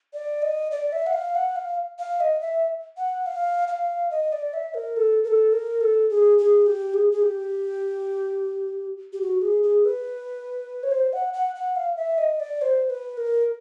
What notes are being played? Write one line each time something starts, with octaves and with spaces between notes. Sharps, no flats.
D5
D#5
D5
E5
F#5
F5
F#5
F5
F5
D#5
E5
F#5
F5
F5
D#5
D5
E5
A#4
A4
A#4
A4
A#4
A4
G#4
G#4
G4
G#4
G#4
G4
G4
F#4
G#4
G#4
B4
C#5
C5
F#5
F#5
F#5
F5
E5
D#5
D5
C5
B4
A#4